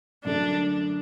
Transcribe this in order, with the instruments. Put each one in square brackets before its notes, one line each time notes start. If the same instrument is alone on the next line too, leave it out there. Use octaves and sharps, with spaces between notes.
[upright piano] F#2 D3 A3 [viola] D4